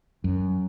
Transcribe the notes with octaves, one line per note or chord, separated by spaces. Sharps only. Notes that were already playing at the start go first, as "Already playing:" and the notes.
F#2